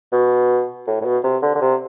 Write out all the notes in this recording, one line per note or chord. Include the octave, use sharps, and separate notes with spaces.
B2
A2
A2
B2
C3
D3
D3
C3